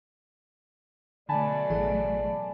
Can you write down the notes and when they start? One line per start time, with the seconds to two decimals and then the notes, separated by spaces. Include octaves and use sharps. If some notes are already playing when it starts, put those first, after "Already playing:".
1.29 B2 D3 F#3 A3 D5 G#5 A5 B5
1.70 A1 E3 G#4